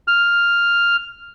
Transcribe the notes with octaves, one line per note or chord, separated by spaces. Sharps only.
F6